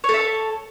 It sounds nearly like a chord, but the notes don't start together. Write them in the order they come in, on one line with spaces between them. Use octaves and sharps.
C#5 A4 E5 A5